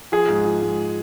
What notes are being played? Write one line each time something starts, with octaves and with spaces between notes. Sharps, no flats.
F3 G#4
G#2
F3
G#2